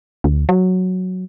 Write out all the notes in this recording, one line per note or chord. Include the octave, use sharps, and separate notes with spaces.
D2
F#3